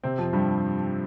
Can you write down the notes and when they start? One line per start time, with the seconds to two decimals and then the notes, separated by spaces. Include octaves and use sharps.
0.03 C3 C4
0.18 F2 F3
0.33 G2 G3